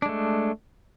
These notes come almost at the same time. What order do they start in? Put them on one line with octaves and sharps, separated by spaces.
D4 G#3 A3